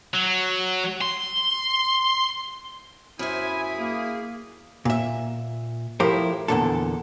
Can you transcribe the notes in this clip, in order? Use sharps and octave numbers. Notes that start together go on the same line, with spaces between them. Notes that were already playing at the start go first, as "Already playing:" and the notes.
F#3
C6
F#2 E4 C5 G#5 B5 D#6
A#3 G#4
A#2 E5
A2 F3 E4 G4 A#4 C5
E2 G2 A#2 D3 A4